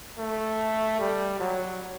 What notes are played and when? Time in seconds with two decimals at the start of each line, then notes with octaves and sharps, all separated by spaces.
0.18 A3
0.99 G3
1.40 F#3